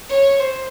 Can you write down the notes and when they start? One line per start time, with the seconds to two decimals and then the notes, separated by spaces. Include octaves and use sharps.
0.09 C#5
0.40 C5